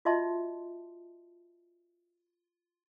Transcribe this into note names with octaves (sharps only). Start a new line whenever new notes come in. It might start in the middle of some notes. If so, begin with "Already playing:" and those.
F4 F#4 D#5 E5 A5 C6